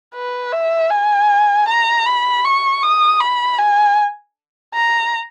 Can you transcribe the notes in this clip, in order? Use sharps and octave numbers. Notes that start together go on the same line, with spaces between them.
B4
E5
G#5
A#5
B5
C#6
D#6
B5
G#5
A#5